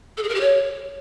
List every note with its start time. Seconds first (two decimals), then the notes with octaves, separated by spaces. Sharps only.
0.17 A4
0.23 G#4
0.29 A#4
0.35 G4
0.40 C#5